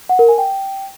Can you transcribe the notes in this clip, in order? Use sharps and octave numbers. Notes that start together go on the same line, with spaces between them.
F#5
A#4
G#5
G5